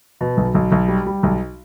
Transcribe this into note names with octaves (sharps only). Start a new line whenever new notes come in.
B2
B1
B1
B1
G3
G3
B1